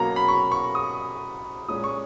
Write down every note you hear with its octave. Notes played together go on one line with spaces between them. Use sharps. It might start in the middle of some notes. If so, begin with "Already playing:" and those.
Already playing: B2 F#3 A#3 C#4 A#5
B5
C#6
C#6
D#6
A#2 G#3 C#4 D#6
C#6